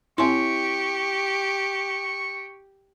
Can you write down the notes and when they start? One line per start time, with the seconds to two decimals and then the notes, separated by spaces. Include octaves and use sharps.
0.18 C4 E4 G4 C#5 C6 C#6